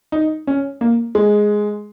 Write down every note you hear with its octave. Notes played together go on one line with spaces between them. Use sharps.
D#4
C#4
A#3
G#3